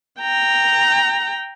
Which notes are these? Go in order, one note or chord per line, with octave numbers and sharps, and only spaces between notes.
G5 A#5